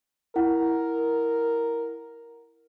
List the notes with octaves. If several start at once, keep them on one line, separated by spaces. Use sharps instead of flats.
E4 A#4 F#5